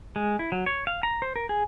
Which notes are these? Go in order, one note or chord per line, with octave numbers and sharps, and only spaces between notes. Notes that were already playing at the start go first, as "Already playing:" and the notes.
G#3
E4
F#3
C#5
F5
A#5
C5
A#4
G#4